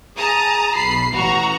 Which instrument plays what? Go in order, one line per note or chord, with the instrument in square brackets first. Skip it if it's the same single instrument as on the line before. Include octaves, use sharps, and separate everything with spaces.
[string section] G#4 A5 A#5 D#6
B1 B5 C7
A1 F#4 A#5